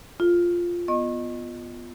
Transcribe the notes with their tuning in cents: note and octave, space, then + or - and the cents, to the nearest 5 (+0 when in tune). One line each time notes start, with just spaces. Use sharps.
F4 +0 A4 +0
B3 +0 D#5 -20 C#6 -35